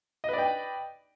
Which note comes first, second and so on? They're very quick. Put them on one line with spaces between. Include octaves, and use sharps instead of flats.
D#5 B4 D5 G5